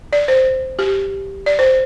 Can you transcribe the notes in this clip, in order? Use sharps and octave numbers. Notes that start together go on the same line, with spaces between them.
D5
C5
G4
D5
C5